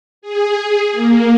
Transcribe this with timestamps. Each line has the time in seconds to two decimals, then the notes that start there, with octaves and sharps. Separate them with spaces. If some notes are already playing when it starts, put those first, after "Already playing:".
0.22 G#4
0.92 A#3